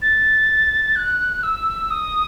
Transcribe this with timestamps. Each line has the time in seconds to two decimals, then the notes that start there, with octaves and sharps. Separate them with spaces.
0.02 A6
0.96 F#6
1.43 E6
1.90 D#6